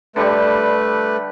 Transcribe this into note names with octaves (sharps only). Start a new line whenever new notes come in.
D3 G3 A3 G4 B4